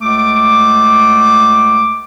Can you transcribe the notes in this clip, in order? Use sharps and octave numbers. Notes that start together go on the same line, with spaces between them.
C#2 A3 D6